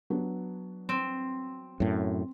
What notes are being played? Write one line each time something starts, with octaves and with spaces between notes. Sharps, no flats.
F#3 B3 D4
C4
F#2 A2